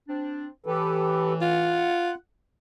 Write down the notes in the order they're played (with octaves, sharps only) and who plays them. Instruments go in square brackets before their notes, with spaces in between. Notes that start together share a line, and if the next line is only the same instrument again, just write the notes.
[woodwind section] C4 D4
[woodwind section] A2 E3 [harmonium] G4 A4 B4
[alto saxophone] F4 [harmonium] F#5